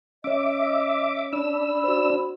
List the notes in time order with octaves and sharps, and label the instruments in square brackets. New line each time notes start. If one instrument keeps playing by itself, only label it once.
[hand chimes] C#4 C#5 [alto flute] D#5 [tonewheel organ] E5 D6
[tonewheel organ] D4 E6 [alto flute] B5
[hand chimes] F#4 C5